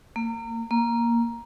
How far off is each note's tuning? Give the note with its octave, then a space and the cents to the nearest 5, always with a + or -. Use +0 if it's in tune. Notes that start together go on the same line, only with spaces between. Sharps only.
A#3 -30
A#3 +5